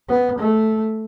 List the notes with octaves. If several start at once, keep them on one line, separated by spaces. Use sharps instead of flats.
B3
A3